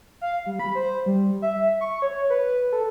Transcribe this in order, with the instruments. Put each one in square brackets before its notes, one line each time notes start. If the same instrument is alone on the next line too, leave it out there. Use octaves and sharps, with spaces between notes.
[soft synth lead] F5
G3
B5
C5
G3
E5
C#6
C#5
B4
A4